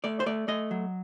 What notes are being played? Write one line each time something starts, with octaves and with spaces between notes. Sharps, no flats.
A3 D5
C5
A3 D5
A3 D#5
F#3